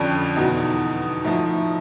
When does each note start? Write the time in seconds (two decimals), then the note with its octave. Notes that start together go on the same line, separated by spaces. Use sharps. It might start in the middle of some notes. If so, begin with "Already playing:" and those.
Already playing: F2 D3 F3 C#4 D4
0.36 E2 B2 D#4
1.24 A2 F3 D#4